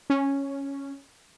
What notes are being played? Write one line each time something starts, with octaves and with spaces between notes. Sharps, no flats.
C#4